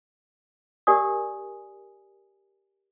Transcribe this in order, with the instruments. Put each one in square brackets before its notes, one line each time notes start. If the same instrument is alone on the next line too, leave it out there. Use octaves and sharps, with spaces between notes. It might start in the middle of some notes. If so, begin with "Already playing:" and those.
[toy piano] G4 A#4 D5 G#5 D#6